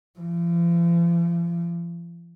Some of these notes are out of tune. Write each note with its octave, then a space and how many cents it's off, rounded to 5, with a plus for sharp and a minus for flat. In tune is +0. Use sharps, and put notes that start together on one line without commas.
F3 -45